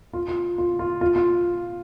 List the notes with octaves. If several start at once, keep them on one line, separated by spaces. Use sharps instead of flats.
F4
F4
F4
F4
F4
F4